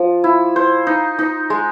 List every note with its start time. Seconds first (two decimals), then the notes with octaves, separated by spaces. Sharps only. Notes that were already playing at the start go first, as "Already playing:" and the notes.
Already playing: F3
0.24 E4
0.56 C5
0.87 D#4
1.19 D#4
1.50 G#3